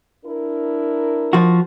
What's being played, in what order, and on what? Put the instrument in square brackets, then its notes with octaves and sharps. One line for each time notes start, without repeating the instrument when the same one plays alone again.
[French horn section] D4 E4 A#4
[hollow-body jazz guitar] F3 F#4